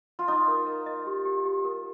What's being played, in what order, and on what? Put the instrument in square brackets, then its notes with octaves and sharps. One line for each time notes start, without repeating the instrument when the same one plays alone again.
[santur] F4
[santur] D#4 [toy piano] D#5
[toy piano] A#4
A#4
D#5
G4
G4
G4
A#4